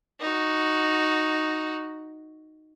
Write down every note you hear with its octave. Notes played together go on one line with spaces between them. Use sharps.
D#4 F#4